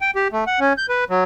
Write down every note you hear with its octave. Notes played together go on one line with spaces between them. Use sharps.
G5
G4
A3
F#5
C#4
G6
B4
F#3